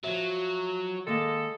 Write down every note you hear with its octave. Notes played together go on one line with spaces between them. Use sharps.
F3 F#3 E5
D#3 G#3 A#3 A4 F5